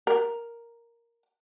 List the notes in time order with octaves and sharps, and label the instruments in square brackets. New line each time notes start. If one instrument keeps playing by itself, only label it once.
[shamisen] A#4